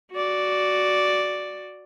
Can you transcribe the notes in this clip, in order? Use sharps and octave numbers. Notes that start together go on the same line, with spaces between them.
F#4 D5